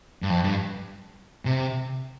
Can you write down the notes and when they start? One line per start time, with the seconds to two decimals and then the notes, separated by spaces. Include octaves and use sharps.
0.23 G2
0.29 F2
0.44 G2
1.45 C3